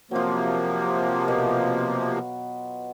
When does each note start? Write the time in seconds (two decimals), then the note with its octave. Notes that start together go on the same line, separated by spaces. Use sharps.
0.11 C3 F3 F#3 A#3 F4
1.28 B2